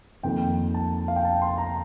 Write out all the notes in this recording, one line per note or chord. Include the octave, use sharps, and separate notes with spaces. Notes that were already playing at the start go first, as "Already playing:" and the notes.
F2 D#3 A#3 G5
A5
F5
G5
A5
C6
A#5